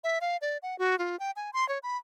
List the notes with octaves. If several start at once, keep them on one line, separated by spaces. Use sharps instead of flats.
E5
F5
D5
F#5
F#4
F4
G5
G#5
C6
C#5
B5